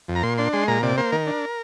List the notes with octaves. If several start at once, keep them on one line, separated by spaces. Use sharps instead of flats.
F2
A#5
A#2 C6
D4 C6
G#3 C6
A#2 A#5
C3 D5
A#3 C5
D#3 A#4
D4